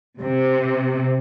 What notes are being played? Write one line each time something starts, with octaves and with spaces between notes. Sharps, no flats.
C3